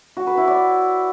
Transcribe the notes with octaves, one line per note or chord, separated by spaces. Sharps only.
F#4
B4
E4
D5